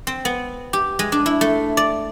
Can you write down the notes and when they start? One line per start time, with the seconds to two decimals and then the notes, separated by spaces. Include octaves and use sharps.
0.07 C4
0.25 B3
0.73 G4
0.99 G#3
1.12 D4
1.26 E4
1.41 A3
1.77 D5